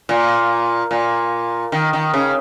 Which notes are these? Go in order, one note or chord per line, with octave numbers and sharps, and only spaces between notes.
A#2
A#2
D#3
D#3
C#3